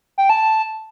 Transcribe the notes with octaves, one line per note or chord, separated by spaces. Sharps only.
G5
A5